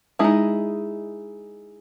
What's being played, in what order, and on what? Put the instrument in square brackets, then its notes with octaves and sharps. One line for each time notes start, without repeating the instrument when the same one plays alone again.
[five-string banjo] G#3 D#4 E4 G#4